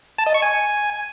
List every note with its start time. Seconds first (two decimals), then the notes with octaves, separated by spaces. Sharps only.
0.18 A5
0.26 D#5
0.34 C#6
0.42 G#5